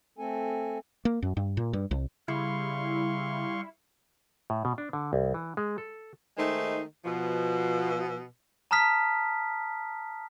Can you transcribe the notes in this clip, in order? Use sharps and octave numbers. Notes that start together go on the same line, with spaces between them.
A3 C4 A4 G#5
A#3
F#2
G2
A#2
G2
C2
C#3 G3 E4 F5 C6 C#6
A2
B2
D4
D3
C2
E3
G#3
A4
D#3 G#3 A3 D#4 C5
B2 F3
A5 A#5 D#6 F6 B6